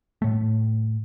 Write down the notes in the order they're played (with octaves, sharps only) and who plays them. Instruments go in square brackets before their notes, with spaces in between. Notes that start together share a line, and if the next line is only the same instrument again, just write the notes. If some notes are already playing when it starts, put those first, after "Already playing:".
[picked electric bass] A2 A3